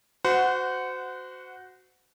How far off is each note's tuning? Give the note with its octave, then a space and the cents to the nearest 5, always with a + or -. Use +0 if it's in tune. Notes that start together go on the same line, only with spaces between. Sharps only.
F#4 +0 C5 -30 F#5 -10